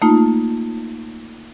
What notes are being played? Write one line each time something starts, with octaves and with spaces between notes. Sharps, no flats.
A3 A#3 D#4 F4